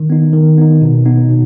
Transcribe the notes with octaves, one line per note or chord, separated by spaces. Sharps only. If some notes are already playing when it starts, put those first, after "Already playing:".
Already playing: D#3
B3 D#4
D#3
B3 D#4
B2
B3 D#4
B2